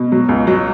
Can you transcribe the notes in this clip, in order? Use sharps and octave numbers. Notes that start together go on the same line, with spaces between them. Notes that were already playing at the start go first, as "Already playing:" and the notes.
Already playing: B2
F#3
C#2
F#3